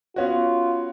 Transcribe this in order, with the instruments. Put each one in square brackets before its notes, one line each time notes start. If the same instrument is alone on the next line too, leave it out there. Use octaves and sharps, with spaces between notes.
[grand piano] B3 C#4 F#4 [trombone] F4